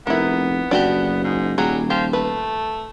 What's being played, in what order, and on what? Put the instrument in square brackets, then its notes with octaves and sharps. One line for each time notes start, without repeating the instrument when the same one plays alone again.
[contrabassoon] F1 [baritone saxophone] B3 [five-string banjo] E4 A#4
[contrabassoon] F#1 [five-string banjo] D4 F#4 G4
[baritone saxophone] G#2
[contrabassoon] D#1 [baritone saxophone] F#3 [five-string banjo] G3 F#4 G#4
[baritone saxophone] F3 [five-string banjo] G4
[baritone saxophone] A3 [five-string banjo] B4